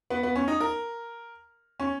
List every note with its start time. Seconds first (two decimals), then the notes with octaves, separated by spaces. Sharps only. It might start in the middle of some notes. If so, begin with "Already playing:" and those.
0.10 B3
0.23 B3
0.36 C#4
0.48 D#4
0.60 A#4
1.80 C#4